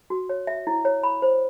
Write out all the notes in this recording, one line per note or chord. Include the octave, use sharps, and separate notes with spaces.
F#4
C#5
E5
E4
C#5
B5
C5